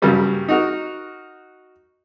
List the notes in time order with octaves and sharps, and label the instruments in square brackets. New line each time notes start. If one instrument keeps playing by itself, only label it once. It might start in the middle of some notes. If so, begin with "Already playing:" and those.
[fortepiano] G2 C#3 F#3 G3 A#3
D#4 F#4 A#4